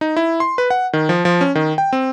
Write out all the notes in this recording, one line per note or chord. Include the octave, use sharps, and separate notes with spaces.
D#4
E4
C6
B4
F#5
D#3
F3
F3
C#4
D#3
G5
C4